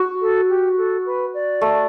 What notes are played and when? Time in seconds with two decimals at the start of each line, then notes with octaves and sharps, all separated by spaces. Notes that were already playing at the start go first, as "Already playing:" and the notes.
Already playing: F#4
0.21 A4
0.49 G4
0.77 A4
1.06 B4
1.34 D5
1.61 A3